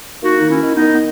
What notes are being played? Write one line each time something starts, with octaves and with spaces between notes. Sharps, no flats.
A#3 D#4 F#4
D#3 D#4
C#4 E4
D#3
B3 D#4
D#3
B3